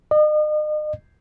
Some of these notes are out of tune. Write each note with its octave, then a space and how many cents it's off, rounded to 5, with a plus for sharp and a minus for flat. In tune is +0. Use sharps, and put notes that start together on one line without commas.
D#5 -40